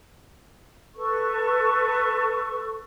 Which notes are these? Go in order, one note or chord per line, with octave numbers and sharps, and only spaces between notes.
A4 B4 C#6